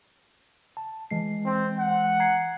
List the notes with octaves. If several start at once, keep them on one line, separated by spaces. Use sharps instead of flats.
A5
E3 G#3 C7
C4
F#5
A#5 G#6 C7